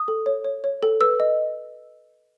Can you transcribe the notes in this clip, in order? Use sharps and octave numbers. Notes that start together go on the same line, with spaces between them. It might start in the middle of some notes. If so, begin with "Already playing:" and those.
Already playing: D#6
A4
C#5
C#5
C#5
A4
B4 E6
D#5